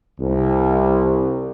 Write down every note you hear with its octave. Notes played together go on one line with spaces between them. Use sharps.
C2